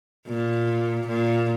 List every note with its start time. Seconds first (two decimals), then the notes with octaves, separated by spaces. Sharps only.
0.27 A#2
1.08 A#2